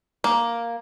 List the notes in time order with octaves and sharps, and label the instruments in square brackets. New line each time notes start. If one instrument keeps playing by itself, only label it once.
[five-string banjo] A#3